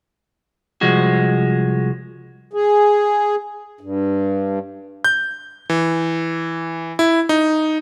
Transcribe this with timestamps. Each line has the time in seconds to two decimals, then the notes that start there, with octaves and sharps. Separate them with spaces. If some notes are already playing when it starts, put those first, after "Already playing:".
0.81 C2 F3 G#3 F#4
2.53 G#4
3.81 G2
5.04 G6
5.70 E3
6.99 E4
7.29 D#4